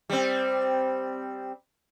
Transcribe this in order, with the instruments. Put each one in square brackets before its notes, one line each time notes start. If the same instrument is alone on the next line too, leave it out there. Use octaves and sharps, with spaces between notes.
[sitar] G3 C4